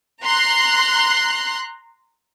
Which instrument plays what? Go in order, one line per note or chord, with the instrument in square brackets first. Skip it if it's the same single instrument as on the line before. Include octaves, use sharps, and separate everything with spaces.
[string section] A#5 C6 F#6